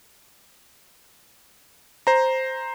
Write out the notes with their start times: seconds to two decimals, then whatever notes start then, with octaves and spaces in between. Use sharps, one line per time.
2.07 C5 A#5